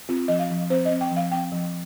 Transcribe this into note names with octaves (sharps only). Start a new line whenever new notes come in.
C4 F4
F3 D#5
F5
F3
C4 C5
D#5
C4
G5
F3
F5
C4 G5
F3